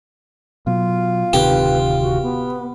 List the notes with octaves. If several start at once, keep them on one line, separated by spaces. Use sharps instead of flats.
B2 F#3 F4
D1 C3 D#3 G4 B4
F#4
B3